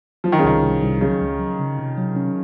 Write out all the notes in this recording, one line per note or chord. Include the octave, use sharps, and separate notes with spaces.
F3 F#3
D#3
C#3
C2 D#3
C2
C2
C#3 F#3
C#2
F#3
C#3
C3
F#3
C#4